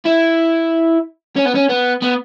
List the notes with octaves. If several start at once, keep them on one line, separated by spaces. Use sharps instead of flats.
E4
C#4
B3
C#4
B3
B3